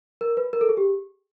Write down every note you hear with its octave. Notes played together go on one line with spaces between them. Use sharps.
A#4
B4
A#4
A4
G#4
G4